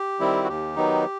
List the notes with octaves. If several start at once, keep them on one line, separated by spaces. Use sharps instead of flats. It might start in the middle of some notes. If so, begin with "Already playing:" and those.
Already playing: G4
D#3 G3 C4 E4
F#4
D#2 G4
D#3 F#3 B3 D#4